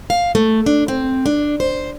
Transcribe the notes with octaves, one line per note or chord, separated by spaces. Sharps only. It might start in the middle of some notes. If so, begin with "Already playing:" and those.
F5
A3
D4
C4
D4
C5